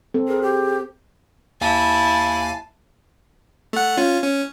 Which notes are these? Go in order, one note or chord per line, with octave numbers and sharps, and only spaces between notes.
C4 A4
G#4 A#4
G4
D#2 E4 F5 G#5 A5
A3 F#5
C#4 F4
C#4